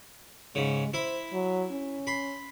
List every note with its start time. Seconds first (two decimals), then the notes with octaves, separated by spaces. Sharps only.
0.55 G#2 C#3 G#3
0.94 E4 C5 B5
1.33 F#3
1.71 C#4
2.07 B5 C6